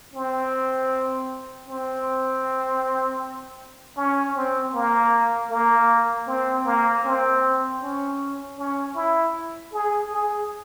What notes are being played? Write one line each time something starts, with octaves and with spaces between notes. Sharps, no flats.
C4
C4
C#4
C4
A#3
A#3
C4
A#3
C4
C#4
C#4
E4
G#4
G#4